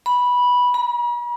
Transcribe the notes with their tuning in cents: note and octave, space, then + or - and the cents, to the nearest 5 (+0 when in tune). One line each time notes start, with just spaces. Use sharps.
B5 -10
B5 -45